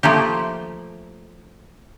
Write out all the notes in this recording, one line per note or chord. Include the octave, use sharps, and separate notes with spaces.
F3 A3 A#3 G4